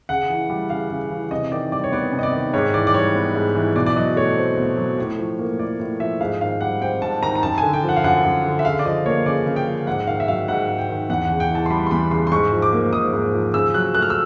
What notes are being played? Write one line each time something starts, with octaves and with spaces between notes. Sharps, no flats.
C#3 F#5
E3
G3
C#3 F5
C#3
E3
C3 D#5
D#3 D5
G3 D5
C#5
B3 D5
C3
D#5
D5
D#3
G#2 C#5
E3 D5
D5
G3 C#5
B3
G#2
E3
B2 D5
D5
F#3 D#5
A3 C#5
C4
B2
F#3
A2
F3
A#3
A2 D5
A2
F3 E5
G#2 F5
D#3 F5
G3 F#5
C4 G5
G#2 A5
D#3 A#5
A#5
F#2 A5
G#5
D3
G5
F3
F#5
F5
F#2 F#5
F#2
D3
E5
C#3 F5
D5
F3 D#5
A#3 C#5
C#3 D5
C#3
G5
F3
G#2 F#5
D#3 F5
E5
F#3 F5
G#2 F#5
G#2
G5
D#3
E2 F#5
C#3 F#5
G5
E3 A5
C6
G3 B5
C6
E2 B5
C#3 C6
C6
G#2 C#6
F3
D6
A#3
G#2 D#6
G#2
F3
C#3 E6
F#3 F#6
A3 F#6
F6
E6